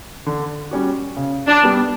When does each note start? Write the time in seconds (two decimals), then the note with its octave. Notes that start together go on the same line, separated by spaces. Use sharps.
0.26 D3
0.71 G3 C#4 F#4
1.16 C#3
1.47 D4
1.63 G3 B3 D4